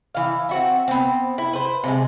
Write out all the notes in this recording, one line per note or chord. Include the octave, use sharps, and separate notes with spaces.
E3 F5
C4 F#4 E5
B3 C4
E4
B4 C5
C3 E3 G#3